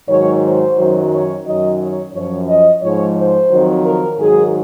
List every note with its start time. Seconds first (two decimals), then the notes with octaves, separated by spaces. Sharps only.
0.08 G#2 D#3 F#3 C#5
0.43 C5
0.77 F#2 D#3 F#3
1.11 C#5
1.45 F#2 D#3 F#3 D#5
1.79 C#5
2.13 F#2 F3 C#5
2.47 D#5
2.81 G#2 F3 C#5
3.16 C5
3.50 F2 D#3 F#3
3.84 A#4
4.18 G#2 D#3 F#3 G#4